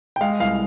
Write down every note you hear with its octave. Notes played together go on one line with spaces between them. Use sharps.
G5
G#3 F5
C2 F5